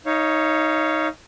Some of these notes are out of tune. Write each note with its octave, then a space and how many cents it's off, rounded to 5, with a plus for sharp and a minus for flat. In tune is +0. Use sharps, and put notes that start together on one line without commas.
D#4 +15 C#5 +0 F5 -25